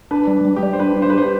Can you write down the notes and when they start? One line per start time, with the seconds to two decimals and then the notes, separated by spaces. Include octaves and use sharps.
0.11 D4 B4
0.27 G3
0.45 G3
0.56 G4
0.63 G3
0.73 C5
0.80 D4 B4
0.97 D4
1.02 C5
1.10 B4
1.14 G4 C5